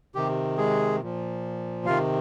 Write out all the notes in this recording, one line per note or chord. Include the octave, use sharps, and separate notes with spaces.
C3 D#3 G4
G#3 G#4
A#2 F3
C3 D#3 F4 F5